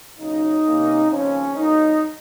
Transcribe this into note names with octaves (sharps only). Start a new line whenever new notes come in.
D#2 C#3 F#3 D#4
C3 D#3 A#3 C#4
D#2 C#3 F3 C4 C#4
F2 D#3 F#3 A#3 D#4